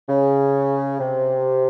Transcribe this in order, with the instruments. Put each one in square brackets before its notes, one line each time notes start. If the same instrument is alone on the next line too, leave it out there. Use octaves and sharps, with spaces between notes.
[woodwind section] C#3
C3